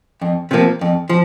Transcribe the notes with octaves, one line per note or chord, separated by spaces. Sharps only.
F2
C3 F3 A#3
F2
F3